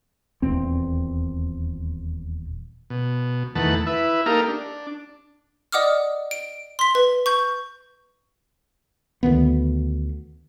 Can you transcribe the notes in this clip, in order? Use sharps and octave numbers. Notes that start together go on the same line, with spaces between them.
D#1 E2 C4
B2
E2 D#3 A3 B4 F#5 A5
E4 B4 E5
A#3 D#4 G4 A4 A#4 F5
D4
D5 D#5 F#5 D6 D#6 F6
D7
C6 B6
B4
C#6 G6
D2 D#3 B3